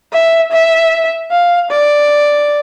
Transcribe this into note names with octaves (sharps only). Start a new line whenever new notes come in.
E5
E5
F5
D5